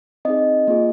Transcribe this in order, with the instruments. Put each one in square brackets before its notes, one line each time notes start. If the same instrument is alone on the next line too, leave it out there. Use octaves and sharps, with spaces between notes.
[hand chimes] C4 D#4 G#4 D#5
A#3 F4 G#4